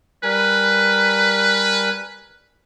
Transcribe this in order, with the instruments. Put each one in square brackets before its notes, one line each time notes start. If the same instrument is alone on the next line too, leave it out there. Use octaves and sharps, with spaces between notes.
[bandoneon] G3 A#4 G#5 [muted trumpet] B4